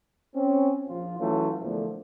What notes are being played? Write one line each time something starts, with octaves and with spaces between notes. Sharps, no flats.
C4 C#4
A#1 F3 F4
E3 F#3 A3 C#4 F4
E2 A#2 D3 F3 A3